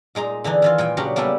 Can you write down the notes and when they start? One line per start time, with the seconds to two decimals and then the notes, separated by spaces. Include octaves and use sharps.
0.15 A#2 G#3 D#4 A#5
0.44 D3 E3 D4 D#4
0.62 D#3 E3 F4
0.78 A#2 G5 G#5
0.97 C#3 F#3 C#4 D4 F#4 G4
1.16 G3 A#3 B3 D4 E4 G4